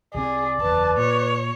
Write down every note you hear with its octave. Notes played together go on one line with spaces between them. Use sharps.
C2 C3 C4 G#4 D5
F#1 E2 B4 A5
A#2 C#5